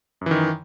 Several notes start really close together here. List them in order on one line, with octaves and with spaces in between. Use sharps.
F#2 E3 D#3